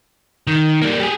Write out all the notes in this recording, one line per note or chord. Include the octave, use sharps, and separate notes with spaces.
D#3
G3 A#3
G4 G#4